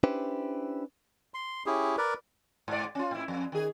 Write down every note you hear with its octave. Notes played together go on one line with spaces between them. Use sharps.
C#4 D4 E4 G4 B4 C5
C6
C#4 E4 G4 G#4
A#4 B4 D5
G#2 D5
C#4 F4
A2 E4
F2
D#3 G#4